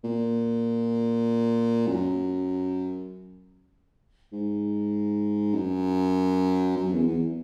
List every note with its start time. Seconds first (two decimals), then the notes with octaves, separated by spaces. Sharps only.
0.04 A#2
1.87 F#2
4.32 G#2
5.54 F#2
6.77 F#2
6.92 E2
7.07 E2